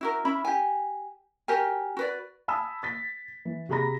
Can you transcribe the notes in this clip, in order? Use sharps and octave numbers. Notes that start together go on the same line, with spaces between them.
E4 F#4 A#4
C#4 E4 E5 B5
G4 G#5
F#4 G4 A#4 G#5
F#4 B4 D5
G#5 A5 B5 D#6 E6
A6 B6
E3
C3 F#4 G#4 A#5 B5 A#6